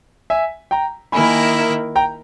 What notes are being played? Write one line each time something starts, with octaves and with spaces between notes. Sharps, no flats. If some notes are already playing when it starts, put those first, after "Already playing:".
E5 G#5
G5 A#5
D#3 A#3 E4 A#4 G#5 B5
G5 A#5